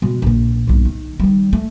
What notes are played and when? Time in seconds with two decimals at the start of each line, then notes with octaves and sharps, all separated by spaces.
0.02 B2 G#3
0.22 A#1 A#2
0.67 B1 G2
0.85 D#3
1.20 D#3 G3
1.53 A3